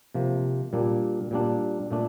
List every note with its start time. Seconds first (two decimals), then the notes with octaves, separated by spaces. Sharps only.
0.15 C3 F3 A#3
0.73 A#2 G3 A#3 D4
1.31 A#2 G3 A#3 D4
1.91 A#2 A3 D4